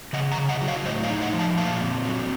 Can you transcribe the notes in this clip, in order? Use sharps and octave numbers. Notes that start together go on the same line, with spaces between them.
C#3 D#5 F#5
F#5 A#5
C#3
D#5 F#5
F#3
C#5 F5
A2 C5 D#5
C#5 F5
D#4
D#5 F#5
F3
F5 A5
A#2 F5 A5
C4
F#3